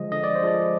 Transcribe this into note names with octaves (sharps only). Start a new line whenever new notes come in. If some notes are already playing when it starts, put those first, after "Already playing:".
Already playing: D3 F3 G#3 D#5
D3 D#5
D5
C5
F3 G#3 D5